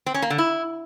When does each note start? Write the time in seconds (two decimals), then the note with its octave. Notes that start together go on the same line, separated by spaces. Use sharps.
0.06 C4
0.14 C#4
0.22 A#3
0.30 D3
0.38 E4